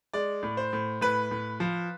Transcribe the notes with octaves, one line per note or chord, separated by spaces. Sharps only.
G#3 D5
A2
C5
A2
A2 B4
A2
F3